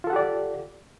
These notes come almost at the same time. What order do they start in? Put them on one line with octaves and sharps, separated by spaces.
F4 A4 F#5 G4 D5